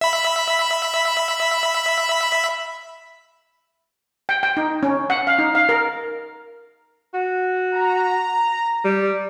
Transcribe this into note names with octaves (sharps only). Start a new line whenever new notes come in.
E5 B5
G5
G5
D#4
C#4
F#5
F5
D#4
F5
A#4
F#4
A#5
G3